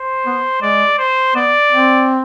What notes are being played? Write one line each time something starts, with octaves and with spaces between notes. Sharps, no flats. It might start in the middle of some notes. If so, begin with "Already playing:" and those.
Already playing: C5
B3
G#3 D5
C5
B3 D5
C4